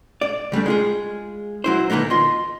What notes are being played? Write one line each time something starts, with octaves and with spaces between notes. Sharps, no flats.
D5
C#2 G3 A3 D4
G#3 F4 G#4
F#3 E4 C5
D3 E3 A#3 B3 D#4
F4 D#5 C6